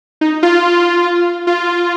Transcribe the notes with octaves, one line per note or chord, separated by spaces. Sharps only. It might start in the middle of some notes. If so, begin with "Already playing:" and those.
D#4
F4
F4